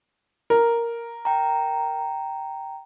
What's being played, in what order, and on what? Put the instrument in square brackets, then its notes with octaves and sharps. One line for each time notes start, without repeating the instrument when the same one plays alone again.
[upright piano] A#4
[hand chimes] G5 A#5